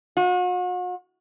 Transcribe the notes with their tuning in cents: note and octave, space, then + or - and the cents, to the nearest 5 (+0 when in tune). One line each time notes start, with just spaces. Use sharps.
F#4 -40